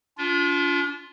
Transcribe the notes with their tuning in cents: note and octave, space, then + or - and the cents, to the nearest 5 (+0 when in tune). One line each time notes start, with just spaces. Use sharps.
D4 -40 F4 +0